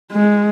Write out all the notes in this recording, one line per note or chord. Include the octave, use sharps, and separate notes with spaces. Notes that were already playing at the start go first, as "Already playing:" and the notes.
G#3